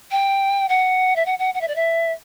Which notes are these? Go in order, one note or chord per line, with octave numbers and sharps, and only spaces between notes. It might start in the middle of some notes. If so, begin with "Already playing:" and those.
G5
F#5
E5
F#5
F#5
F#5
E5
D5
E5